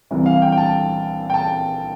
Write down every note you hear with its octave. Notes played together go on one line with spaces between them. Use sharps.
C2 C3 E3
F5
G5
G5
A5
G5
A5